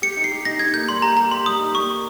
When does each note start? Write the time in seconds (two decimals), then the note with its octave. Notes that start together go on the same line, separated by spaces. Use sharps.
0.02 G4 C#7
0.17 D#4
0.24 C7
0.32 G4
0.45 D#4 A#6
0.59 D#4 G#6
0.74 A#3 G6
0.89 G3 C6
1.02 G4 A#5
1.17 G4 A#5
1.31 G4 C6
1.46 G3 D#6
1.60 D#4
1.75 A#3 C#6